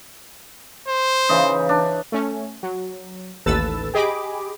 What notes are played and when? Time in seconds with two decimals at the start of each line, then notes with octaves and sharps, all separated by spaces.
0.88 C5
1.29 C#3 E3 D#4
1.69 D4
2.12 A3 C#4
2.63 F#3
3.46 A1 D#2 A4 B4 E6 A6
3.94 G4 G#4 D#5 B5 D6